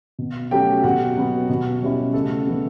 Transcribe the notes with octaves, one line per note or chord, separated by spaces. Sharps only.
B2
F#3 A3 C#4 G4 G5
B2 F#4 F#5
F#3 B3
B2
G3 C#4 E4
C#3 A3 A4
E3 B3 D4